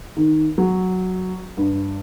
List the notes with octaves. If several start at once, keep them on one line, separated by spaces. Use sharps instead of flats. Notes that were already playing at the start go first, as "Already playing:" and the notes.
D#3
F#3
G2